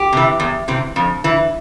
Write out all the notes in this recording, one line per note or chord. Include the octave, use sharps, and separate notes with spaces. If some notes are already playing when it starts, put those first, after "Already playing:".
Already playing: G4
C3 E3
E2
C3 E3
F2
E3